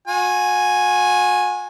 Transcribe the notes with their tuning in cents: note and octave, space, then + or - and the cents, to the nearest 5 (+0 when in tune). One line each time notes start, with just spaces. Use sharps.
F#4 -40 G#5 +0